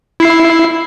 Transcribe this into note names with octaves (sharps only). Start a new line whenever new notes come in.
E4 C7